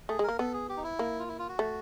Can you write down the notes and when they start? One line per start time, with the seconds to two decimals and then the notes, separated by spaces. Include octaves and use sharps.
0.09 A3 G#4
0.19 G#3
0.24 A#3 A#4
0.39 B3 A4
0.53 G#4
0.69 G4
0.77 D#4
0.84 E4
0.99 A#3
1.19 F4
1.28 E4
1.39 F4
1.49 F#4
1.59 A3